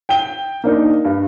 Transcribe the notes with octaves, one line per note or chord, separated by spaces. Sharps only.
G5 G7
A#3 D4 D#4
G2